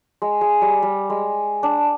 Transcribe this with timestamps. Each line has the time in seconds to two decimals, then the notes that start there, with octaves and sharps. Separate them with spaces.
0.22 G#3
0.41 G#3
0.62 G3
0.82 G3
1.10 G#3
1.63 D4